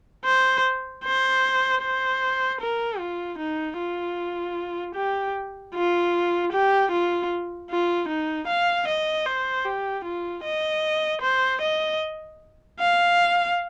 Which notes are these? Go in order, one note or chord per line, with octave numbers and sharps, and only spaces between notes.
C5
C5
C5
A#4
F4
D#4
F4
G4
F4
G4
F4
F4
D#4
F5
D#5
C5
G4
F4
D#5
C5
D#5
F5